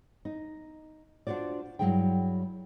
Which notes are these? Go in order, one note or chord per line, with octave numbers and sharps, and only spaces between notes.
D#4
D4 F4 F#4 C5 D5
G2 F3 F#3 E4 G#4 G5